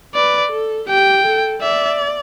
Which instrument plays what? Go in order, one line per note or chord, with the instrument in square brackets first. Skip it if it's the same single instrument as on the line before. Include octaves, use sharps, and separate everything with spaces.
[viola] B4 [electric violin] D5
[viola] A4
[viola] G4 [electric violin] G5
[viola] A4
[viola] D5 [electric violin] E5